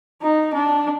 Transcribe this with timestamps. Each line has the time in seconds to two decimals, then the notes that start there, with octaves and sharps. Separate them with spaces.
0.23 D#4
0.54 D4